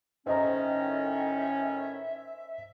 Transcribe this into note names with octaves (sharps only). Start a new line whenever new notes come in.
A2 D#3 C#4 C5 D#5 E5 A#5